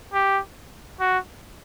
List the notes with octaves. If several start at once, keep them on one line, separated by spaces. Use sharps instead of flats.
G4
F#4